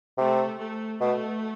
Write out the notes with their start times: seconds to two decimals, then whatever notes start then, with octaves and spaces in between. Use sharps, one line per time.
0.18 C3 A3
0.60 A3
1.01 B2 A3